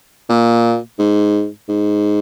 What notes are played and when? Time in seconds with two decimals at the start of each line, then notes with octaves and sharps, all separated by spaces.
0.29 A#2
0.99 G#2
1.69 G#2